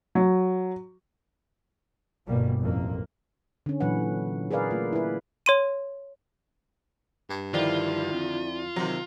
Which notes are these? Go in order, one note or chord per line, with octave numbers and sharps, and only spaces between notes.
F#3
G1 B2 G3 A#3
A1 F2 A#3
D3 C#4
A#2 E3 F#3 B4 F#5
G#4 A#4 B4 D5 F5
A3 A#3 F4
E4 B4
C#5 C6 D#7
G2
D3 D#3 F3 E4 F4 D5
F2
C3 D#3 F#3